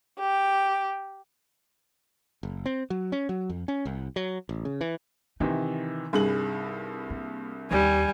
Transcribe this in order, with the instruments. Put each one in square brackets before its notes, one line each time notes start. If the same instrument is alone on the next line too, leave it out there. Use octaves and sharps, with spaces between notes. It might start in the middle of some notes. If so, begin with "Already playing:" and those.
[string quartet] G4
[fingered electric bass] F#1
C4
F#3
C#4
F#3
F2
C#4
C2
F#3
A1
C#3
E3
[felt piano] C3 D#3 E3 [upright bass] D#4
[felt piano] C2 [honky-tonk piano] G2 G#4 F#7
[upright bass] A#3
[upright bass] D#2 [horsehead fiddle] G3 G#5